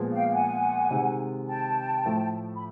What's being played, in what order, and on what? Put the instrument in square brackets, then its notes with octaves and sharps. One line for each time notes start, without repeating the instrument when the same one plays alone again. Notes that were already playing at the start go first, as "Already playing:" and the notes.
Already playing: [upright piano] A#2 F3 G#3 B3
[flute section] F5 G5
G5
F#5 G#5
[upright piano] C3 D#3 G#3
[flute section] G5 A5
[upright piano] A2 F3 A3
[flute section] B5